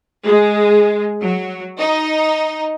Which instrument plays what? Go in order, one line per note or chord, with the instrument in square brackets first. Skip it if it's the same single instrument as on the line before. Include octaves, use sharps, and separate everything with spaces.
[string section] G#3
F#3
D#4